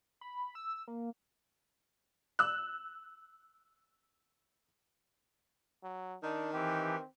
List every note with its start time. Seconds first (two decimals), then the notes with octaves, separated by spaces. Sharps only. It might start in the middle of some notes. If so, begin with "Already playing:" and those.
0.21 B5
0.55 E6
0.88 A#3
2.39 E6 F#6
5.83 F#3
6.23 D#3 D4 D#4
6.53 E3 C4 G4